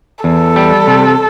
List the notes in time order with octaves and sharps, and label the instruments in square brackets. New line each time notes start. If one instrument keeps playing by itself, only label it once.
[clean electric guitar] E2 [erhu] A4
[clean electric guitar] G3
C3